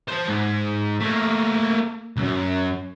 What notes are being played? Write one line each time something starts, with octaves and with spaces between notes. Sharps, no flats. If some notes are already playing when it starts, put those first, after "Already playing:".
C5 A5
G#2
A3 A#3
C2 F#2